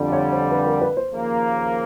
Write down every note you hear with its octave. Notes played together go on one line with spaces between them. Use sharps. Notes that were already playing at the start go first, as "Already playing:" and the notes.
Already playing: F2 D3 G3
C#5
C5
B4
A#4
B4
C5
D#2 C#3 F3 A#3